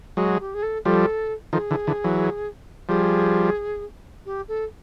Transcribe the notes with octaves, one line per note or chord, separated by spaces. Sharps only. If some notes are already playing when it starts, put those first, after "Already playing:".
F#3 G#3 F#4
G4
G#4
A4
F3 G3 A4
D#3 F3 A4
G#4
D3 E3
D3 E3
E3 F#3
F3 G3 G#4
G4
A4